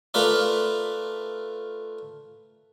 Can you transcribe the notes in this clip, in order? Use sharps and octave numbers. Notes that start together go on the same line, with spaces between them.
A3 F4 A#4 B4 D5